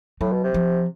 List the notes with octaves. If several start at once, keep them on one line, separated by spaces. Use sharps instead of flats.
A2 F#3
B2
C3
F3